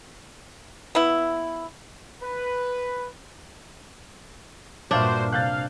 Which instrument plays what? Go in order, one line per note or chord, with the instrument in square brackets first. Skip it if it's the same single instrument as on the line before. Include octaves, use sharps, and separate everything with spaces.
[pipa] B3 E4
[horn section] B4
[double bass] G2 A#2 [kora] D4 [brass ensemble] F#4 C5 [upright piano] E5 F5 F6
[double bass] C3 [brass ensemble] F5 [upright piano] F#6 G6 A6